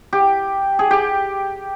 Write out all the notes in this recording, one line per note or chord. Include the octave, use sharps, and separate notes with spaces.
G4
G#4
G4